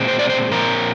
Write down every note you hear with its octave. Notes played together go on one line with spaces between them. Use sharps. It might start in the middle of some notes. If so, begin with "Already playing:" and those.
Already playing: A#2 G#3 C4
C5
D5
C5
A#2 F3 C4 A#4